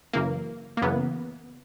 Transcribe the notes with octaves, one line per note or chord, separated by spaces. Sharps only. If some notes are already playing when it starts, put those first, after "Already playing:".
F#2 C#3 E3 A#3
A#3
F#2 C#3 E3 B3